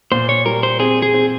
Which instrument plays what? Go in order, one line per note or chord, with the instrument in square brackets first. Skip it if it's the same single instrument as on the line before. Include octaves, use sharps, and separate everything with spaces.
[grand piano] A#2 [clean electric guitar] C5
[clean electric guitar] C#5
[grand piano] G3 [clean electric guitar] A#4
[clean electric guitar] C5
[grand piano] C4 [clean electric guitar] G#4
[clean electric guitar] G#4
[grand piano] C4